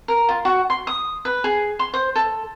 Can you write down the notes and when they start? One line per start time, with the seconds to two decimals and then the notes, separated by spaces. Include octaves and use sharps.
0.08 A#4
0.29 F4
0.45 F#4
0.70 C6
0.87 D#6
1.25 B4
1.44 G#4
1.79 C6
1.94 C5
2.16 A4